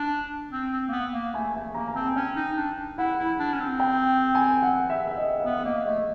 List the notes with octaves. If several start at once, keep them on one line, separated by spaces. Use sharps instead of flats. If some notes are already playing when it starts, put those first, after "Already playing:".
Already playing: D4
C4
C4
A#3
B3
A#3
A3 G#5
A3 G#5
A#3 A#5
A#5
C4 A5
G#5
C#4 G5
D#4
D4
E4 F#5
E4
D4
C#4
C4
G5
G#5
F#5
E5
E5
D#5
F5
B3 E5
E5
A#3 D#5
A3 D#5